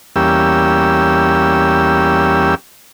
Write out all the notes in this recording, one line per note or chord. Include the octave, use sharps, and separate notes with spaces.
E2 G3 A#3 C#4 G4 E6